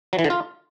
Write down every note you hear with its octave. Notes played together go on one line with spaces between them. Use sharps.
F#3
E3
D3
F4